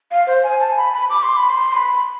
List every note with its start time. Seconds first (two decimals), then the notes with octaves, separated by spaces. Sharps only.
0.11 F5
0.27 C5
0.43 G#5
0.60 A5
0.77 B5
0.93 B5
1.10 D6
1.23 C6
1.37 B5
1.49 C6
1.71 C6
1.75 B5